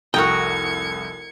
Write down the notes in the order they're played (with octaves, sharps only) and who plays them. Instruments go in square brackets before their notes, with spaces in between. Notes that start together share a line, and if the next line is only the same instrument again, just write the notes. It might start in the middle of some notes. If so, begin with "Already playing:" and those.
[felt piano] F1 C2 [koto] F#4 A#4 D#5 [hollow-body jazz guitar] G5 [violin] G#6 C#7